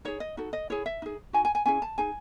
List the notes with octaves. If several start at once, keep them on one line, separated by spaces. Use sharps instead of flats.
D#4 G#4 C#5
D#5
D#4 F#4 A4
D#5
E4 G#4 C#5
E5
D#4 G#4
D#4 F#4 G#5
G#5
G#5
C#4 E4 G#4 G#5
A5
D#4 G#4 G#5